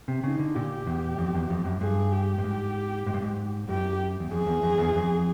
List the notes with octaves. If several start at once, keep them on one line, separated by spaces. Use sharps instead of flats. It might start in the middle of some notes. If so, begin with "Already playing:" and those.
C3
C#3 D#4
D3
A#2 G4
E2
F2
E2
F2
F#2
G2 G#4
G4
G2
G#2
G#2
G2
G#2
F#2 G4
E2
F2 G#4
E2
F2
E2
F2